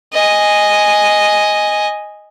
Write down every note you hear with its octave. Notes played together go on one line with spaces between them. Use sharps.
D#5 G#5